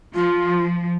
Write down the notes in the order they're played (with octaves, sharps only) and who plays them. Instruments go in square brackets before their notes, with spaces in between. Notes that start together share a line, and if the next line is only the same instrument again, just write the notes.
[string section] F3 [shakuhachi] F4